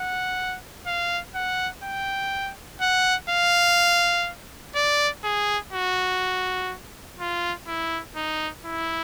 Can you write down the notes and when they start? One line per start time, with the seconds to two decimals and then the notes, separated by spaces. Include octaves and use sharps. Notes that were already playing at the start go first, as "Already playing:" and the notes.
Already playing: F#5
0.87 F5
1.35 F#5
1.84 G5
2.81 F#5
3.30 F5
4.76 D5
5.24 G#4
5.73 F#4
7.20 F4
7.68 E4
8.16 D#4
8.65 E4